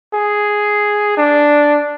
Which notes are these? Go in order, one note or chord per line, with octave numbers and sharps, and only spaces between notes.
G#4
D4